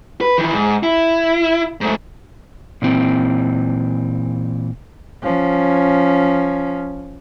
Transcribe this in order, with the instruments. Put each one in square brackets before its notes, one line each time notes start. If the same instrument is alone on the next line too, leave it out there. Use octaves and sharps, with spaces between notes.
[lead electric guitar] B4
D#3 E3
G#2
E4
G#2 A3
[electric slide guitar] A#2 E3 C4
[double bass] F3 C#4